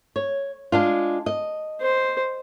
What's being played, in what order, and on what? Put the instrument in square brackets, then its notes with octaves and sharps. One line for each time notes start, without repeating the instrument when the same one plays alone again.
[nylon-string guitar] C#5
G#3 D4 F4
D#5
[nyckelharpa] C5